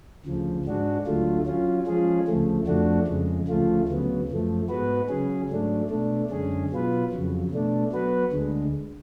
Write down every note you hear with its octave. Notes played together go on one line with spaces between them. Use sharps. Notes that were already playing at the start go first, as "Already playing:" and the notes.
D2 C#3 F3
G#2 G#3 D4 F#4
D2 D3 F#3 A3 F4
F#3 C#4 F4
F3 G#3 C#4 F4 G#4
D2 C#3 F3 A3
F2 F3 A3 D4 F#4
F2 C#3 G#3
D2 C#3 F3 A3 F4
D2 C#3 F#3 B3
F#2 F3 A3
G#2 G#3 B3 F#4 B4
C#3 F#3 C#4 G#4
G#2 F#3 A3 D4
B2 A3 D4
F#2 D3 G#3 C#4 G#4
B2 F#3 B3 F4 B4
F2 C#3 F#3
B2 A3 D4
F#3 B3 F#4 B4
D2 D3 G#3